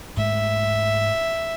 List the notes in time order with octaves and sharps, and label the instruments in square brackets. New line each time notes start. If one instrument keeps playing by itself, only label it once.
[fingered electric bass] G#2 G#3 A3 [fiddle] E5